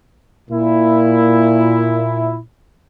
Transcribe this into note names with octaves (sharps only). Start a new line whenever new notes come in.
A#2 E4